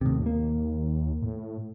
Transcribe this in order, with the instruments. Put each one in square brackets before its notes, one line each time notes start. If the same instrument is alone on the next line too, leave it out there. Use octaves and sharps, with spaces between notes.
[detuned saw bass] D#2 [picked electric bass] A2 C3
[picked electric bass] A#3
[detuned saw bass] A2